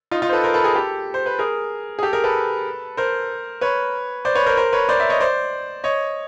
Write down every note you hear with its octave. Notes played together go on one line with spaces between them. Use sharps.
D#4 F4
D#4 F4
C5
A4 B4
A#4 C5
A4 B4
G#4 A#4
G4 A4
C5
B4
G#4 A#4
G#4
G4 A4
G#4 A#4
A4 B4
A#4 C5
B4 C#5
C5 D5
B4 C#5
A#4 C5
A#4 C5
B4 C#5
C5 D5
D5 E5
C#5 D#5
C5 D5
C#5 D#5